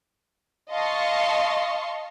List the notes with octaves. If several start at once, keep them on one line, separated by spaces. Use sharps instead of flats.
D#5 F5 A5 C6 C#6